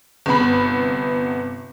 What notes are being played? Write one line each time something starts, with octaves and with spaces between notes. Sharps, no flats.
G1 C3 B3 B5